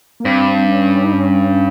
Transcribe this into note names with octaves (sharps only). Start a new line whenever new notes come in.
A#3
G2 C4
C#4
D#4
C#4